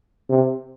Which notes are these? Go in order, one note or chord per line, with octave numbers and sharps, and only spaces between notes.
C3